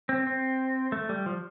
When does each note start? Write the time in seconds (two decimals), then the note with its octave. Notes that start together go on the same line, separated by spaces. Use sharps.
0.09 C4
0.27 C4
0.92 A3
1.09 G3
1.26 F3